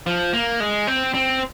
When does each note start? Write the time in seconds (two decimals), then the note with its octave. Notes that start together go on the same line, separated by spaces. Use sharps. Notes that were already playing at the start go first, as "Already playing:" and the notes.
0.07 F3
0.33 A#3
0.60 G#3
0.87 C4
1.14 C4